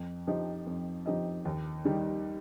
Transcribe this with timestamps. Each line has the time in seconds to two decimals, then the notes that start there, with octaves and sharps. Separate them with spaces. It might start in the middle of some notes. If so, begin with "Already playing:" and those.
Already playing: F2
0.27 F3 D#4 G4 D#5
0.66 F2
1.06 F3 D#4 G4 D#5
1.45 D#2
1.85 D#3 G3 D#4